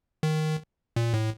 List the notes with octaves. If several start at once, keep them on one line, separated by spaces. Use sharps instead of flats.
D#3
A#2
A2